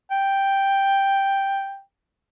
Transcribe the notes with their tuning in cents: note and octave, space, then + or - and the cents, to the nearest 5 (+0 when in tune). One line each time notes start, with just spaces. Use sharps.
G5 +0